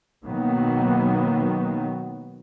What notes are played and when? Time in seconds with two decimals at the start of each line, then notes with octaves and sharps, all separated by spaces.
0.25 B2 D#3 F#3 A#3 B3